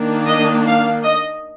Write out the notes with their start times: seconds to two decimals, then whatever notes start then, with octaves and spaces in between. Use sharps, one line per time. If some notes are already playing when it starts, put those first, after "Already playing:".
Already playing: D#3 A#3 D4
0.27 D#5
0.67 F5
1.04 D#5